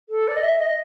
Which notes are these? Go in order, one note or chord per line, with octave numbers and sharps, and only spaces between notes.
A4
D5
D#5
E5
D#5